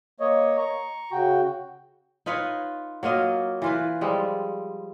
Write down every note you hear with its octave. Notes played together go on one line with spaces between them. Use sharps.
A#3 C#5 D#5
A#5 C#6
C#3 F#4 G5
D#4 F4 B4 C#5
F#3 A#3 F4 D#5
E3 F4 B4
F3 G3 G#3